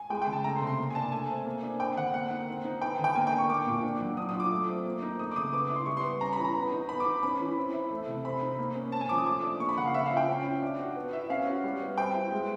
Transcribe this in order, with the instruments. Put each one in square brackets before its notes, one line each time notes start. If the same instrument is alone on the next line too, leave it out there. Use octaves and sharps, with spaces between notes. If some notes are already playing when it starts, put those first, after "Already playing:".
Already playing: [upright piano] G#5
[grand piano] G#3 [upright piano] G5
[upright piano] G5
[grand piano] C#3
[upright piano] A5
[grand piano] A3 [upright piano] A#5
[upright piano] C6
[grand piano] C3
[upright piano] C6
[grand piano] A#3
[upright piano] G#5
[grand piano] D4 [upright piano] A5
[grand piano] A3 [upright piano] G#5
[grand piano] C4
A#3
D4
[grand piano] C4 [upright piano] G5
[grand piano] D3 [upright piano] F#5
[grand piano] A#3 [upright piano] F#5
[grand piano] D#4
C4
D#4
[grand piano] B3 [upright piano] G5
[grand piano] D3
[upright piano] G5
[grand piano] A#3 [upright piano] G#5
[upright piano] G5
[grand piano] D4
[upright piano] C#6
[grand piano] A#3 [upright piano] D6
[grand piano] A#2
D4
F#3
[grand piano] D4 [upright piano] D#6
[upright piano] D#6
[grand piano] F4
[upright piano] D6
[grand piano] A3
C4
A#3
D#4
[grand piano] A3 [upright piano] D#6
[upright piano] D6
[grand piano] C#3 [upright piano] D#6
[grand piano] B3 [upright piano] D6
[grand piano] E4
[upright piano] C6
[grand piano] G3 [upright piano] C#6
[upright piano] C6
[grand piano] B3
[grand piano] C#4 [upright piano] A#5
[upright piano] B5
[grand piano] E3
[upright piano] A#5
[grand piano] B3
D#4
[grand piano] B3 [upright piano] B5
[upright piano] D6
[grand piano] D#4
[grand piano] C#4 [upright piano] B5
[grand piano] E3
C4
E4
A3
C3
[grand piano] C4 [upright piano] B5
[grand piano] D#4
A#3
C#4
[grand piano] C#4 [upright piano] A5
[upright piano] G#5
[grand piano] F3 [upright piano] D6
[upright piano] D#6
[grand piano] A3 [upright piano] D6
[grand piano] D4
[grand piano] A#3 [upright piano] C#6
[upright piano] B5
[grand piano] C#3 [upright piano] F#5
[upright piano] F5
[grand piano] C#4 [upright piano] E5
[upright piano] F5
[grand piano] F4
[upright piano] G5
[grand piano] C#4
F4
D4
F#4
B3
[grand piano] E4 [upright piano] E5
[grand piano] C#4 [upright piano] F5
[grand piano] F#4
G3
B3
[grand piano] C4 [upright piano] G5
[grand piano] E4
G#3